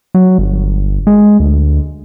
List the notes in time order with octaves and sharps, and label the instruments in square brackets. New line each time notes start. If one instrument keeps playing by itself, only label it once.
[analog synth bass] F#3
G1
G#3
D2